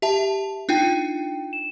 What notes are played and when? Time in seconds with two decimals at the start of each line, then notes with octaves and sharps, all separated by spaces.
0.02 G4 E5 A5
0.69 D4 D#4 F4 G5
1.53 E7